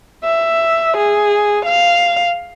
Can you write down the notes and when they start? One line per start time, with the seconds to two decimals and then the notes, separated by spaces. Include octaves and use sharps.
0.24 E5
0.97 G#4
1.66 F5